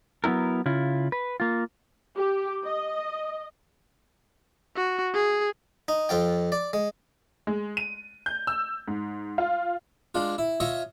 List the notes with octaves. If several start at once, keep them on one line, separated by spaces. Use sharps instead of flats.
F#3 B3 C4 E4 A#4
C#3 E4 F4
B4
A#3 F4
G4
D#5
F#4
G#4
D#4
F2 F4 G5
D5
G#3
G#3
D#7
G6
E6
G#2
F4
G#3 D4 F4
E4
F4 C#5 D#5 E5